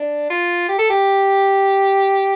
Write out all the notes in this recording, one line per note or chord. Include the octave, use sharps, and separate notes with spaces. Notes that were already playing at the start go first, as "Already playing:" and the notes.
Already playing: D4
F4
G4
A4
G4